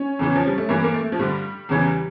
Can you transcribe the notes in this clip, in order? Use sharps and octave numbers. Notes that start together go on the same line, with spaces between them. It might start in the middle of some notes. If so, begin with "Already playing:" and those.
Already playing: C#4
E2 C#3 E3
F3
G3
A3
G2 E3 A#3
A#3
A3
F3
G2 D3 G3
E2 C#3 E3